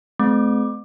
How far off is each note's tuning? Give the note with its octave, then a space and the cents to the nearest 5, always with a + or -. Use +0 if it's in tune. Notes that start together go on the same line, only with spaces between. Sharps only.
A3 -45 C4 -40 D6 +15